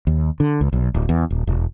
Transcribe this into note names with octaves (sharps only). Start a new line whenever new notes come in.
D#2
D3
C#2
B1
D1
E2
D#1
E1